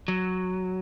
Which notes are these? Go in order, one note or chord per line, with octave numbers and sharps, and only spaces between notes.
F#3